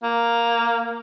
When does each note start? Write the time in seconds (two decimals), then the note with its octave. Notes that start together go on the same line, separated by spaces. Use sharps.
0.03 A#3